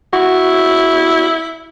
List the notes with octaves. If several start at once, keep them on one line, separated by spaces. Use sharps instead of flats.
E4 F#4 C#6